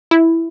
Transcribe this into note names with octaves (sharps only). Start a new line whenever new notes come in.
E4